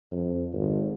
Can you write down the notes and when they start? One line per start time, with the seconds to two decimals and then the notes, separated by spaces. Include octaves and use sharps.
0.12 F2
0.53 G#1